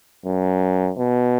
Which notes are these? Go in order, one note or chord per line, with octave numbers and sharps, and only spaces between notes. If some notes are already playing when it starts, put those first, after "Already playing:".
F#2
B2